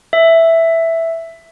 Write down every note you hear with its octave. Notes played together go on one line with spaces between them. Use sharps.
E5